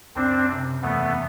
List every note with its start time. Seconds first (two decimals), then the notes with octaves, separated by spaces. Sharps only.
0.15 F#1 C4 D4
0.49 C3
0.83 E2 A3 B3